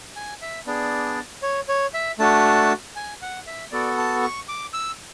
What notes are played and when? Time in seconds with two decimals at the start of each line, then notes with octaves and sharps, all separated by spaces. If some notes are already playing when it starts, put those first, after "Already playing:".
0.16 G#5
0.42 E5
0.67 B3 D4 G#4 D5
1.42 C#5
1.69 C#5
1.94 E5
2.19 A3 D4 F#4 A5
2.96 G#5
3.22 F#5
3.47 E5
3.71 B3 F#4 A4 D5
3.98 A5
4.22 C#6
4.48 D6
4.73 E6